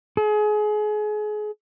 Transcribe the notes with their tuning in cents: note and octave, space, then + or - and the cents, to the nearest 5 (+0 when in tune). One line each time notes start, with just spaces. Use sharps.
G#4 +30